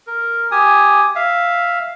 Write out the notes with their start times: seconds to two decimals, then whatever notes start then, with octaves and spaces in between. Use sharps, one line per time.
0.07 A#4
0.51 G4 G#5 D#6
1.15 E5 F5